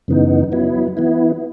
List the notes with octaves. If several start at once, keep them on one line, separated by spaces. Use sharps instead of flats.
F#2 C#3 E3 B3 D#4
F#3 B3 E4
E3 B3 E4